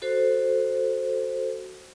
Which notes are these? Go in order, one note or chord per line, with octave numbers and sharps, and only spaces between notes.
F#4 A4 C5